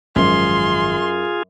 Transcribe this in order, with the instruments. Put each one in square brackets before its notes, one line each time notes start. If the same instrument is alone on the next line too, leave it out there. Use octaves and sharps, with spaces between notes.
[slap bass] G#1 F3 G#3 [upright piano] F#2 [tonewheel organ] F4 G#4 [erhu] C6